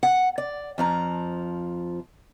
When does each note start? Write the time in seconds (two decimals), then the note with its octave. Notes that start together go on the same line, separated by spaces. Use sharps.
0.03 F#5
0.38 D5
0.78 F2 F3 A#5